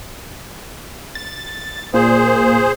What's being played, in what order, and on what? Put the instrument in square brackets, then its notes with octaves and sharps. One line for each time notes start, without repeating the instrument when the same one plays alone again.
[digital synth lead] A6
[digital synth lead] A#2 [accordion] G#4 C5